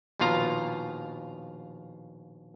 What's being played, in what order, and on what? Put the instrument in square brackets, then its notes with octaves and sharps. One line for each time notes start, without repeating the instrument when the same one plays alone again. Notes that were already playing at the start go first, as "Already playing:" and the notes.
[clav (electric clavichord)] A#1 D#2 B2 F4 F5 A#5